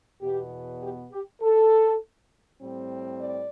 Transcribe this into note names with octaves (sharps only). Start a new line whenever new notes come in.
E2 B2 B3 G4
G4
G4
A4
A2 G3 C4
D5